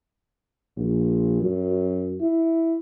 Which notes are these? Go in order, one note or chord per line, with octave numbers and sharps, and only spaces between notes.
A#1
F#2
E4